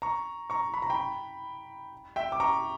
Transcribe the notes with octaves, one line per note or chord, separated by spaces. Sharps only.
A#5 C#6
A#5 C#6
B5
A#5
G5 B5
E5 G5
D6
A#5 C#6